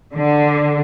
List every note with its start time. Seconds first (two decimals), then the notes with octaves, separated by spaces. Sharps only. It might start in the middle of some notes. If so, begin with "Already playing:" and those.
0.14 D3